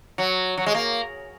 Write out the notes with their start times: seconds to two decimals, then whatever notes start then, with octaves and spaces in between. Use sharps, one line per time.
0.18 F#3
0.58 F#3
0.66 G#3
0.75 A#3